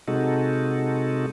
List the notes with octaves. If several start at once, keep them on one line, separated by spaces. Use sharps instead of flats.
C3 G#3 D#4 F#4 A4